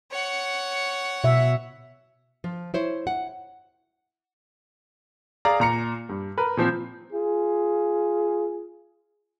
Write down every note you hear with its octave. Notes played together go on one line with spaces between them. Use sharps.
C#5 F#5
B2 E5
F3
E4 C5 C#5
F#5
G#4 D5 F5 A#5
A#2 A#5 C#7
G2
A#4 B4
A#2 F3 C4
F4 G#4